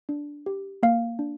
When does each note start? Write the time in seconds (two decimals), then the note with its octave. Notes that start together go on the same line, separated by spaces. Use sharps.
0.09 D4
0.46 G4
0.83 A#3 F5
1.19 D4